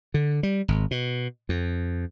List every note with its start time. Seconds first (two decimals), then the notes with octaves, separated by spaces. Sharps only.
0.14 D3
0.43 G3
0.68 G#1
0.91 B2
1.49 F2